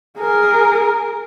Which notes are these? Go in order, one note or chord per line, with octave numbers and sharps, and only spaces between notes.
G#4 A#4